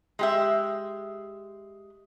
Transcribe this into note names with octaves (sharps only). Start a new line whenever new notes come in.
G#3 G4 E5